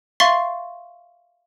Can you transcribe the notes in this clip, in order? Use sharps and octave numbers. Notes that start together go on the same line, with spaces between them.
E5 F5 C6 C#6 A6 C7